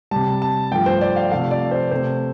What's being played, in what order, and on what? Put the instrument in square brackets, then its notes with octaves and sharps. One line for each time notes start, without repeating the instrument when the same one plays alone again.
[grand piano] C3 G3 A5
A5
G2 F3 A3 G5
C5
D5
F5
C3 F3 A3 F5
D5
C5
C3 A3 C5